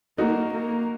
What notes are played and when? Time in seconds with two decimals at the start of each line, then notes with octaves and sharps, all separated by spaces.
0.18 A#3 D#4 F#4
0.54 A#3